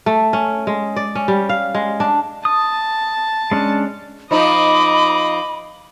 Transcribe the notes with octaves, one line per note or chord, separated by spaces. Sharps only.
A3
C#4
G#3
D5
C#4
G3
F5
G#3
D4
A5 D#6
G#3 C#4 D4
F3 D#4 D#5 B5 D6